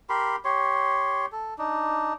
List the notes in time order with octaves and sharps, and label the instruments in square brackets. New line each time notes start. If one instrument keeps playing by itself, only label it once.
[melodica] G4 A#4 B5 C6
G4 C#5 C6
A4
D4 D#4